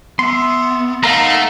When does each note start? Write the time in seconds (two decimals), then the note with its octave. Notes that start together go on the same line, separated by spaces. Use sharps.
0.19 B3 E5 C6
1.04 A3 D#4 A#4 F5 F#5 A#5